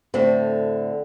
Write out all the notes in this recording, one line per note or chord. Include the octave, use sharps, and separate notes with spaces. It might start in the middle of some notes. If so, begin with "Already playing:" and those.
A2 D3 C4